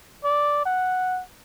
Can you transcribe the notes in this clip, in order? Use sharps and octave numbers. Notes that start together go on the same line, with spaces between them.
D5
F#5